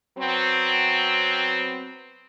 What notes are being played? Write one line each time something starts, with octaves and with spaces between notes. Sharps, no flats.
F#3 B3 C4